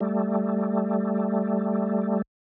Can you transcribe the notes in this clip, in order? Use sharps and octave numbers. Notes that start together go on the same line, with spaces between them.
G3 A3